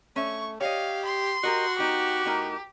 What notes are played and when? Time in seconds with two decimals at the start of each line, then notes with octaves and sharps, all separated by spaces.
0.16 A3 C#4 E5 C#6
0.61 G4 C#5 D#5 F5
1.05 C6
1.44 F#4 G4 A#4 D#5
1.79 B3 D#4 G4
2.25 A2 D#4 A#4